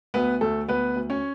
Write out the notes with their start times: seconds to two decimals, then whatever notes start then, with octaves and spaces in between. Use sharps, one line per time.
0.14 D2 B3 B4
0.41 D2 A3 A4
0.68 D2 B3 B4
0.96 D2
1.10 C#4 C#5